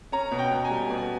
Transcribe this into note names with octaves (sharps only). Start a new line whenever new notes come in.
C#4 A#5
B2
G5
B2
G#5
G3
B2 G#5